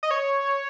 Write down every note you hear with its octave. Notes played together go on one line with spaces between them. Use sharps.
D#5
C#5